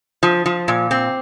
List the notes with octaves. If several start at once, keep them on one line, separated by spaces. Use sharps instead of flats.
F3
F3
A#2
C4